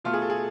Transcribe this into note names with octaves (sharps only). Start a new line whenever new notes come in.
B2 A3 F4
G#4
A4
G#4